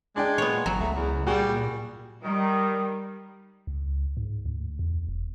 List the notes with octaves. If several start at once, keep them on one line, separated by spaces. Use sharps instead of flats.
G#3 D4 D5 G5
A#2 B3 C#5
G1 F#3 A#5
C#2 A3
E2
A#2 G3 F#4 G#4
D#3 G3
C#2
G#2
D2
E2
E1